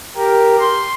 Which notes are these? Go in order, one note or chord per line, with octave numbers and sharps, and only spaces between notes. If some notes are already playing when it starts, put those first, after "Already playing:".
G4 A#4
C6